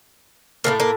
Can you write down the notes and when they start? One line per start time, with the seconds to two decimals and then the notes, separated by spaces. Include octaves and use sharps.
0.64 A2 F#3 A3 A#3
0.80 A#3